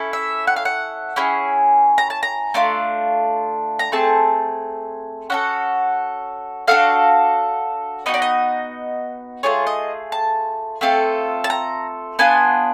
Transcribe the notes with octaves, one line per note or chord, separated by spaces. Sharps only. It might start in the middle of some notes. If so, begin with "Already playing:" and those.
Already playing: C#4 E4 A4
E5
F#5
F5
F#5
C#4 E4 G#4
A#5
A5
A#5
A3 D4 F4
A#5
A3 C4 G#4 A5
C#4 F#4 A4 F#5
D4 F#4 A4 F5
B3 D#4 F#4 D#5
D5
D#5
A3 C4 F4 G#4 C#5
D#5
A5
A3 C4 F4 A4
A5
A#5
B3 D4 F4 G#5